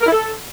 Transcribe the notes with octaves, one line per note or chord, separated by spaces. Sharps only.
A#4
E4
A4